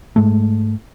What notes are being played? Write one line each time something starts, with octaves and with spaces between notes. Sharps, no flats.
G#2 G#3 A3